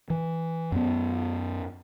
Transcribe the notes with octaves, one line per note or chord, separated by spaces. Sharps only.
E3
F#2 B3